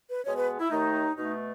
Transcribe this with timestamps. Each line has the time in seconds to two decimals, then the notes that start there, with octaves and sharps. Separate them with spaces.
0.09 B4
0.25 B2 G#3 B3 C#5
0.36 B4
0.60 E4
0.71 D#2 D#3 A3 D#4
1.17 B2 A3 D#4